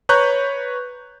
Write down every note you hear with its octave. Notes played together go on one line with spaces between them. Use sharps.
B4 C#5 A#5 C#6 F#6 G6